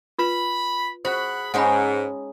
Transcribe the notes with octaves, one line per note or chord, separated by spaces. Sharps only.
F4 B4 B5
F#4 G#4 C5 F#5 B5
G#2 G#3 C#4 D#4 F#5 A5 B5